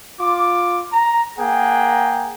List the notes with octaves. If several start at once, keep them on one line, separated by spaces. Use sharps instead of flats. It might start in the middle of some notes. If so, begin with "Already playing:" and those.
F4 D6
A#5
A#3 G#4 F#5 G5